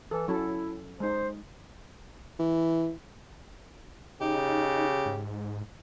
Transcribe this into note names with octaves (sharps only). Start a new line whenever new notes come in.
E3 A4
F#3 C#4 E4 A4
G#3 D#4 C5
E3
C#3 D#4 G4
G#2